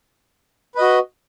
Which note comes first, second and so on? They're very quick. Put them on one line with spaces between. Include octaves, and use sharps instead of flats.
B4 D#5 F#4